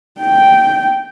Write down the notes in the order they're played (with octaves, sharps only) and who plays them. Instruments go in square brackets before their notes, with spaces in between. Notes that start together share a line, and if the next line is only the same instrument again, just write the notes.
[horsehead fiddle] G5